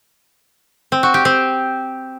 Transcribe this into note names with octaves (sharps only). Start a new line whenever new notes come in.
C4
F#4
G4
C4